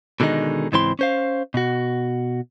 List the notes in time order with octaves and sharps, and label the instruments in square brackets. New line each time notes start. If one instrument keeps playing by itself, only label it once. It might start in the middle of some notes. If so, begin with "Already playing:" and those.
[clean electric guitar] B2 D3 D#3 G#3 D#4
C#2 G#2 E3 C4 E4 C6
C#4 C5 F5
B2 F#4